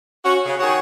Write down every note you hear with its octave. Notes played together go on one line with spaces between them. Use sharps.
C#4 F#4
C#3
D#3 F#4 G#4 C#5 F#5